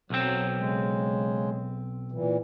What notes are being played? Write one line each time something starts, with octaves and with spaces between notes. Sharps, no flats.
B1 F#3 C4
C#3 G#3
A#2 E3